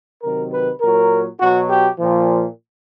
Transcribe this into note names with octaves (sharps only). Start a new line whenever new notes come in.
C3 D#3 F#3 A#4
B4
A#2 F#3 A#4
B2 F#3 F#4
G4
A#2 F3